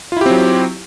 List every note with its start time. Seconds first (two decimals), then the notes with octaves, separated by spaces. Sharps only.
0.12 F4
0.17 E4
0.21 G4
0.26 C4
0.30 F#3